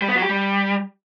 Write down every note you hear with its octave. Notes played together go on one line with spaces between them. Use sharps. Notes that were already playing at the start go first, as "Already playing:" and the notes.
G3
B3
F#3
G4
G3